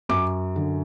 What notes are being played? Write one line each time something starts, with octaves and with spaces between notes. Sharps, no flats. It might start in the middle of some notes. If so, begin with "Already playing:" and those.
F#2 D6
D3